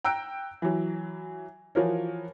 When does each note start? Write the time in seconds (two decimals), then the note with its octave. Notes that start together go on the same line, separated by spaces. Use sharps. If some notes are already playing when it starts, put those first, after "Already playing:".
0.04 G5 A#5 E6 F#6 D7
0.62 E3 F#3
1.75 E3 F3 F#4 A#4 C#5